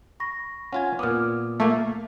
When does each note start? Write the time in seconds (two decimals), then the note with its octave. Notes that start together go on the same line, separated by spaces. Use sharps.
0.20 B5 C#6 A#6
0.73 C#4 F4 F#5 G#5
0.99 A#2 B3 D6 D#6 F6
1.60 A3 A#3